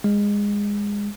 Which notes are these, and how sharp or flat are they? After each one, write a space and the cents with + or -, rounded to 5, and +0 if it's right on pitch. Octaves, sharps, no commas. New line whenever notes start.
G#3 -20